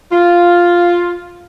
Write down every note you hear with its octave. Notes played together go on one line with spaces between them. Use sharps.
F4